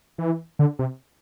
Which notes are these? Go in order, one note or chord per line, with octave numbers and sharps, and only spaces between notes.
E3
D3
C3